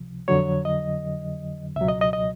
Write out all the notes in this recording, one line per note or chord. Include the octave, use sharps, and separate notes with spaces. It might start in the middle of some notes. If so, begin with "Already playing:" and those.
Already playing: C#2 C3 F3
F2 D3 F#3 C#5
D#5
C#2 B2 F#3 E5
D#5
D#5
D#5